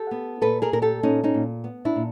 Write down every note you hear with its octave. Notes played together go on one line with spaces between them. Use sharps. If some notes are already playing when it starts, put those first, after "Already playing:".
Already playing: G4 A4
B3
A#2 A4 B4
G#4 A#4
A#2 A#4
G4 A4
A#2 C#4 D#4
C#4 D#4
A#2
B3
D4 E4
A#2